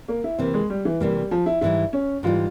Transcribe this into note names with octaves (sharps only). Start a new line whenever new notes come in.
A#3
E4
C3 E3 A#3 C4
G#3
G3
E3
C3 E3 G3 A#3
G3
F3
E4
G#2 E3 G3 E4
C#4
G#2 E3 G3 F4